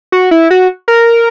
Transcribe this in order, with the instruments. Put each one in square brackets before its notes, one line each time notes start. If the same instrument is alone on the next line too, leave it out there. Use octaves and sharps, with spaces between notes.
[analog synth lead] F#4
E4
F#4
A#4